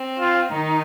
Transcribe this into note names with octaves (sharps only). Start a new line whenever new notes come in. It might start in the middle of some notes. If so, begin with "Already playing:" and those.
Already playing: C4
F4
D#3 D#4